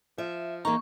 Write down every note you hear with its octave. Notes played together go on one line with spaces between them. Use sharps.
F3 E5
E2 A#3 D#4 A#5 C#6